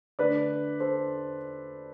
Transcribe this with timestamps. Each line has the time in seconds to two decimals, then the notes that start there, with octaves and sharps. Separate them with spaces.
0.19 D3 A3 D4 B4 D5
0.80 A4 C5